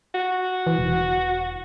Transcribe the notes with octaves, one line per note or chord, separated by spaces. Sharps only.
F#4
E3
E1